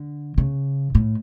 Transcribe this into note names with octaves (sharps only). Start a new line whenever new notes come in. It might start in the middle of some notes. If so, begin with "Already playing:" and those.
Already playing: D3
C#3
A2